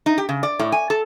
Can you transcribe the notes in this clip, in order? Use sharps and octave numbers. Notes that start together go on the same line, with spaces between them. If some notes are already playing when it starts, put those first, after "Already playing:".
D#4
G4
C#3
D5
A2
G#5
A4